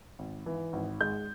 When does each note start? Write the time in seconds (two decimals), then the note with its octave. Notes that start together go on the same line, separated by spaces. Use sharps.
0.19 G#1
0.46 E3
0.73 G#1
1.01 G#3 G6